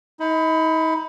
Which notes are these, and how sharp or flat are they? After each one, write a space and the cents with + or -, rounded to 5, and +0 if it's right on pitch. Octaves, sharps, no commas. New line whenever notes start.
D#4 +40 B5 +15